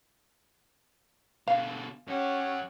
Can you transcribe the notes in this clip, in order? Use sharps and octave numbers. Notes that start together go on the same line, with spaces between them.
B2 D3 F5
F#2 C#4 G4 F#5